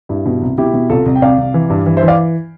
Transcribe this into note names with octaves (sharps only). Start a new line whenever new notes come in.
G2 E4
B2
C2
B2 E4 G4
B2
C2 F4 A4
C2
G5
C2 D5 F5
C2
E3
G2
E3
C5 E5
E3
D5 F5